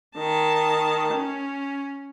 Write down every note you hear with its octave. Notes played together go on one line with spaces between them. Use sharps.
D#3 A5
C#4